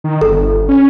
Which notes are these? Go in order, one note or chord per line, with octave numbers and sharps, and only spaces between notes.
D#3
G1 A4
C#4